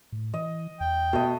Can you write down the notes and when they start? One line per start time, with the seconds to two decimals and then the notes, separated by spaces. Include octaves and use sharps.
0.12 A2
0.34 E3 D#5
0.80 E2 G5
1.13 B2 A3 D#5